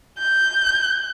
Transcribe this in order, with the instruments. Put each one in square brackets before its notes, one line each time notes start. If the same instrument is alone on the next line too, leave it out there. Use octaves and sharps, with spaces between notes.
[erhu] G6